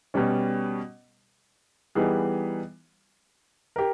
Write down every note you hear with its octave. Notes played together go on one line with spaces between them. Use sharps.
B2 G3 C#4
E3 G3 B3 D#4 G#4
G4 A#4